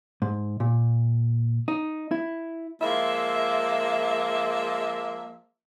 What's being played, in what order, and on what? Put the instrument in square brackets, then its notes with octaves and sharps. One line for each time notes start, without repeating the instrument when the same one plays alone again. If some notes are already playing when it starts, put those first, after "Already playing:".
[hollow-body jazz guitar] G#2
A#2
D#4
E4
[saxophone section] F3 G#3 E5 [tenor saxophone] A#3